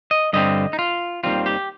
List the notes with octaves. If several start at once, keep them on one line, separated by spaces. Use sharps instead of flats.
D#5
G2 D3 G3 C4 D#5
D#4
F4
D#2 D#3 G3 C4 F4
G4